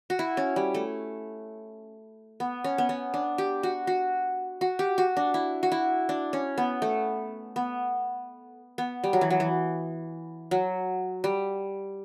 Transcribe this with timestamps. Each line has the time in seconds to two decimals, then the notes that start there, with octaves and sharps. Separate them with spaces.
0.10 F#4
0.19 E4
0.37 C#4
0.56 G3
0.74 A3
2.40 B3
2.64 C#4
2.78 B3
2.89 C#4
3.14 D4
3.38 G4
3.63 F#4
3.87 F#4
4.61 F#4
4.79 G4
4.98 F#4
5.17 D4
5.34 E4
5.63 F#4
5.72 E4
6.09 D4
6.33 C#4
6.58 B3
6.82 A3
7.56 B3
8.78 B3
9.04 G3
9.13 F#3
9.21 E3
9.30 F#3
9.40 E3
10.51 F#3
11.24 G3